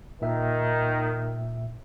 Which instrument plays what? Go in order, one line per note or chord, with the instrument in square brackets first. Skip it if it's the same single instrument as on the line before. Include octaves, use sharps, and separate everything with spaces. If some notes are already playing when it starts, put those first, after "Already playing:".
[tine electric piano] A#2 E5 [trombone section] D#3